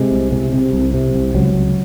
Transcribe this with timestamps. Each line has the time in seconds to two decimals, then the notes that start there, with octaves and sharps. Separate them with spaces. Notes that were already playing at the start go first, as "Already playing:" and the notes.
Already playing: C3 G#3
0.12 C2
0.32 C3
0.53 C3
0.73 C2
0.94 C3
1.14 C2
1.35 C#2 F#3
1.55 C#2